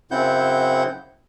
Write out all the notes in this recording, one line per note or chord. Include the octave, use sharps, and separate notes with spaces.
F#2 C#3 C4 E4 F#5 G6